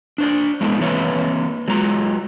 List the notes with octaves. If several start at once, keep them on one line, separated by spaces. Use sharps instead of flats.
D4 C5 D5
G#3 A3 B3 D4 E4
E3 A#3 C4 B4 C#5 E5
F#3 G#3 F4 A#5